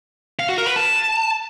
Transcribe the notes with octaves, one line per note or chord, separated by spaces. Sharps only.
F5
F#4
A#4
B4
A5